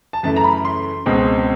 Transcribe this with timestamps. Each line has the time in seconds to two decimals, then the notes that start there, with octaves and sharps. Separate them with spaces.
0.13 A5
0.23 F#2 C#3 E3 A3 A5
0.36 A#5
0.44 B5
0.65 C6
1.06 C#2 B2 G#3 C4